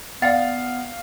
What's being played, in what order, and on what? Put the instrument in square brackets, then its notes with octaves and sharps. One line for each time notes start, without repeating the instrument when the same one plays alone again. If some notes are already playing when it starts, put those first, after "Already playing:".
[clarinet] B3 [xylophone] D5 F#5 A6 [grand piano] F5